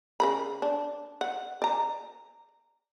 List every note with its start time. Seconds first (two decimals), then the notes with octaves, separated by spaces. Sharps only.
0.20 C#3 A#4 B5
0.62 D4
1.21 F#5
1.62 D5 A#5